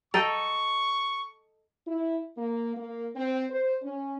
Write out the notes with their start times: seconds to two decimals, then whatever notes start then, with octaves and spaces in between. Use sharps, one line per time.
0.14 A4 D#5 G5 A#5 C#6 A6
1.87 E4
2.37 A#3
2.76 A#3
3.16 C4
3.50 C5
3.82 C#4